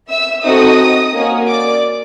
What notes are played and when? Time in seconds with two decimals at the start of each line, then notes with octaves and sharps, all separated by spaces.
0.08 E5 E6
0.43 C4 D#4 F#4 A4 D#5 D#6
1.14 A#3 C#4 F#4
1.49 D5 D6